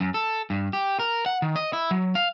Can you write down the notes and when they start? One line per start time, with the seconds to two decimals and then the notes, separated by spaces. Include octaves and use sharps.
0.01 F#2
0.14 A4
0.50 G2
0.73 G4
0.99 A#4
1.26 F#5
1.42 D#3
1.56 D#5
1.73 E4
1.91 F#3
2.15 F5